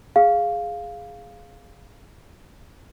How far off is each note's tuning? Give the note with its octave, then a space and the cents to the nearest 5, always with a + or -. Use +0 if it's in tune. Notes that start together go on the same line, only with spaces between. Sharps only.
G#4 +0 F5 +0